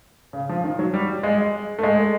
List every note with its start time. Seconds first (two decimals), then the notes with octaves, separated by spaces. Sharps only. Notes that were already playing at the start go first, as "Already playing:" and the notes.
0.33 C#3
0.49 F3
0.64 D#3
0.79 F#3
0.94 G3
1.23 G#3
1.79 A3
1.83 G#3